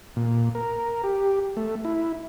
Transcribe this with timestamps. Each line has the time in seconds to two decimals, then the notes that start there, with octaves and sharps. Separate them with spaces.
0.16 A#2
0.55 A#4
1.04 G4
1.57 A3
1.85 E4